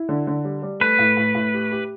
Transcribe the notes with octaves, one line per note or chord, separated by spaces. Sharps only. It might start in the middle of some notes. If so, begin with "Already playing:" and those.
Already playing: E4
D3
D3
G3
G3
A3 B4
A2
A2
A2
G4
G4